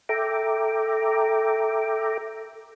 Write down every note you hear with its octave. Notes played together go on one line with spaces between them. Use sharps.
A4 E5 G5 A#5 D6